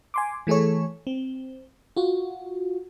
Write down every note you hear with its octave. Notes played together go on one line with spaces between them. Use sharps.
G#5 C6 D6
E3 A3 G#4 A4 C#5
C4
F4 F#4